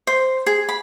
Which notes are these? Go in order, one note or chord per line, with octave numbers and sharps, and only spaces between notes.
C5
G#4
B5